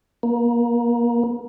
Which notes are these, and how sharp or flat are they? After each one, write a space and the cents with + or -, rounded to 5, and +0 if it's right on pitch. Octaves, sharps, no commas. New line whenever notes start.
A#3 +30